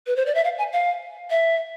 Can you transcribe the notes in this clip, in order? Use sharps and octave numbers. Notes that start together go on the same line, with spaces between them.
B4
C5
D5
E5
F5
G#5
F5
E5